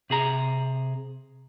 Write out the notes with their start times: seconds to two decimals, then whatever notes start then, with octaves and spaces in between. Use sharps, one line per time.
0.10 C3 G#4 A#5